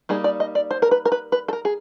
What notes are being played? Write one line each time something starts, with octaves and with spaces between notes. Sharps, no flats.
G3 A#3 D#4 G#4
D5
D#5
D5
C5
A#4
B4
A#4
B4
B4
A4
A#4
G#4